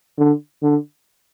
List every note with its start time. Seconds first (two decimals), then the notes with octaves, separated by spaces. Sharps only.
0.18 D3
0.62 D3